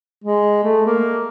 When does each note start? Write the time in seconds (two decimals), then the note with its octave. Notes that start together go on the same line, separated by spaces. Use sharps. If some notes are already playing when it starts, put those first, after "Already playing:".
0.24 G#3
0.63 A3
0.86 A#3